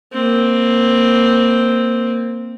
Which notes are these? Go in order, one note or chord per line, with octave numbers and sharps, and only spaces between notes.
A#3 C4